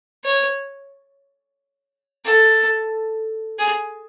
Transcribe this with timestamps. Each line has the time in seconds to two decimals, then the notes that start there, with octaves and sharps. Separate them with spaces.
0.24 C#5
2.25 A4
3.58 G#4